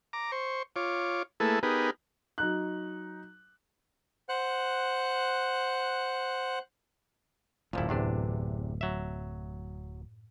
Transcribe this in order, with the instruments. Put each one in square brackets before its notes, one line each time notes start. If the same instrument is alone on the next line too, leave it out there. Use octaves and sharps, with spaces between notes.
[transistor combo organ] A#5 D6
C5 C#6
F4 C#5 D6
A3 A#3 E4 G#4 A4 B4
B3 D#4 G4 G#4 A#4 B4
[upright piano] F#3 D#4 F#6
[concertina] C5 F#5 F#6
[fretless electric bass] D1 G#1 [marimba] F#2 [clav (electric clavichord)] A#2 F3 E4
[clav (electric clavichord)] E2 C3 D4 [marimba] A2 B4
[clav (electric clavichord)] F#3 E5